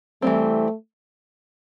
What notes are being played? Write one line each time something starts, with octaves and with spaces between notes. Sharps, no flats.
E3 G3 A3 C4